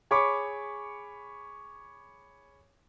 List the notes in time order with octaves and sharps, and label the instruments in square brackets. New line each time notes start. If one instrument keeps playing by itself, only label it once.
[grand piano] G#4 C#5 B5 C#6 D6